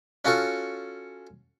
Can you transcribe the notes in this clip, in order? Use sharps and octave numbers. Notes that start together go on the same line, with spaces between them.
C#4 F4 F#4 A4 C#6